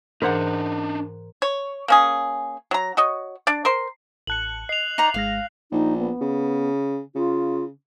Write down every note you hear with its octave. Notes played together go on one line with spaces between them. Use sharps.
G#2 E3 D4 D#4 G#4 A#4 C5 F#5
C#5
A#3 C#4 G#4
F#3 A#5
F#4 C#5 D#5
D4 D5
A#4 C5 C6
A1 A5 F#6 C#7 F#7
D#5 C7 F7
D#4 D5 A#5
G#1 G#3 F5 A#6
A#1 D#4
B3
C#3
C#3 F4